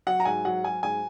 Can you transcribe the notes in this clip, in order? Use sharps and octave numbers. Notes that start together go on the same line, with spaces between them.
F#3 F#5
A#5
G#2 G#5
F#3 F#5
F#3 G#5
G#2 G#5